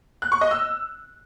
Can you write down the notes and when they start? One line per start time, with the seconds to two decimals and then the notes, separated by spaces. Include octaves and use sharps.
0.22 F#6
0.32 C#6
0.41 D#5
0.51 E6